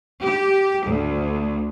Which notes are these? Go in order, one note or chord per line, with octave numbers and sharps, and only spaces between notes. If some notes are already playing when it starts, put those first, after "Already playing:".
G4
D2